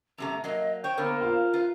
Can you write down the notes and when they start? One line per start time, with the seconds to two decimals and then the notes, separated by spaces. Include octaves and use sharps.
0.18 F#2 C3 A3 A#5
0.44 F#3 A#3 D#5
0.84 C5 C#5 G5
0.97 D3 A#3 B3 A#4
1.21 F4
1.53 F4 B4